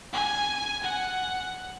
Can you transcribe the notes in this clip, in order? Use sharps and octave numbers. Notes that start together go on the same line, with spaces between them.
G#5
F#5